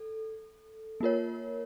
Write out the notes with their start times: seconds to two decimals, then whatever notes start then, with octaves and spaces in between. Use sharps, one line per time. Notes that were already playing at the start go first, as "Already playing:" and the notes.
Already playing: A4
1.00 A#3 F4 A#4 C#5